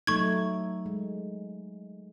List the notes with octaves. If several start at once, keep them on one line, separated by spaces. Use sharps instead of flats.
F#3 A3 D#4 C#6 G#6
G#3